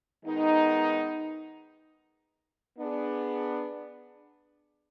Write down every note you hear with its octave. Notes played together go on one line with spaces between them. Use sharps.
D#3 G#3 B3 D#4
B3 D4 G#4